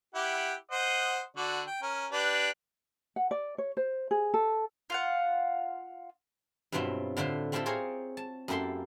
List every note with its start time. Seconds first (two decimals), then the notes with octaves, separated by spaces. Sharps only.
0.15 E4 G4 F#5
0.71 C5 D#5 F#5
1.37 D3 D4 F#4
1.67 G5
1.82 C#4 A#4
2.12 D4 G4 B4
3.16 F#5
3.31 D5
3.58 C#5
3.77 C5
4.11 G#4
4.34 A4
4.90 F4 F5 F#5
6.72 G2 B2 F#3 C4 E4 F4
7.17 A2 D3 E4 F4 C5
7.52 A3 C4 E4 F4 G4 A4
7.66 C4 G#4 C5 C#5 F5 A#5
8.17 A5
8.48 F#2 A#3 E4 G4 A4 C6